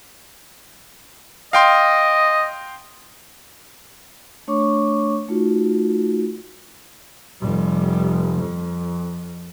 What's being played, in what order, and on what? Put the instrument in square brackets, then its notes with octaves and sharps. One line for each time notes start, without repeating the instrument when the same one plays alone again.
[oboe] D#5 [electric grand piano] F5 G5 C6
[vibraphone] A3 D4 C#5 C#6 D6
A3 D#4 F4 F#4
[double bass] F1 G3
F2